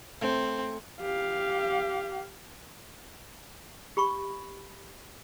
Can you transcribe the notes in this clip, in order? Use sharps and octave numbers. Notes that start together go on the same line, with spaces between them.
A2 C4
G4 F5
G4 B5 C#6